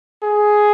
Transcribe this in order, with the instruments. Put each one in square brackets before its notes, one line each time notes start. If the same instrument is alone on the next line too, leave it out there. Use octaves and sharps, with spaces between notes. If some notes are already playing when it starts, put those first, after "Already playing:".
[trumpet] G#4